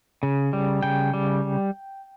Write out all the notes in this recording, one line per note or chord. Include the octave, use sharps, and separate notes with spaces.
C#3
G3
C#3 G5
G3